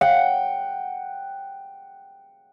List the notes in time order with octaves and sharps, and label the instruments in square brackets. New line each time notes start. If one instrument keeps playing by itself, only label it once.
[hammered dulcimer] F#5 G5